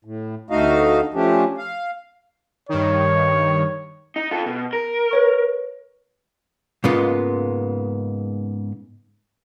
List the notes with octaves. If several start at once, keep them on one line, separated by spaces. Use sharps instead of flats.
A2
D2 A3 D#4 F#4 D#5 F5
F3 A3 C#4 D4 G4
F5
G2 D#3 C#5
D#4
F4 A4
B2
A#4
B4 C#5 C#6
G#2 C#3 G#3 A#3 B3 F4